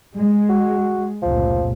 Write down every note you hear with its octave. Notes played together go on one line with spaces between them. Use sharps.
G#3
F#4
F1 C#2 A#2 F3